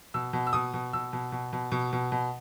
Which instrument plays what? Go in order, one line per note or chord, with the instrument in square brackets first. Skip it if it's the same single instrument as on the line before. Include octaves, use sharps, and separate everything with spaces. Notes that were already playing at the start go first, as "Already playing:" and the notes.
[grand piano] B2 E6
B2
E6
B2 D#6
B2
B2 E6
B2
B2
B2
B2
B2
B2